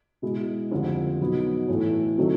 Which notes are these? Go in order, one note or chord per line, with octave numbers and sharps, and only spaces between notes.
B2 G#3 B3 E4
F2 D3 G3
B2 F#3 B3 D#4
A2 E3 A3
C3 D#3 F#3 A3